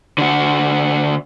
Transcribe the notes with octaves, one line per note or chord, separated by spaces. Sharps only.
D3 F#4